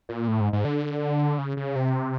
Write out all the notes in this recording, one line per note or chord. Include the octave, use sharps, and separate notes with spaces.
A#2
A2
G#2
G#2
D3
C#3
C#3
C3